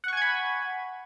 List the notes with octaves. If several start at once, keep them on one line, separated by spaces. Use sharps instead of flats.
F#5 G#5 B5 C#6 G#6